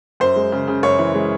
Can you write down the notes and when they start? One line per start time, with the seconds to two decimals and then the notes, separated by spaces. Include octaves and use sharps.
0.20 F#2 C5
0.36 G#3
0.52 C#3
0.68 C#3
0.83 F#2 C#5
0.99 E3
1.14 G#3